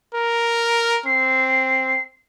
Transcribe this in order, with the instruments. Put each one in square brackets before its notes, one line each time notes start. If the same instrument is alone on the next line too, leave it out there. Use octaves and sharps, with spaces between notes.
[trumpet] A#4
[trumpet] C4 [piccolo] C7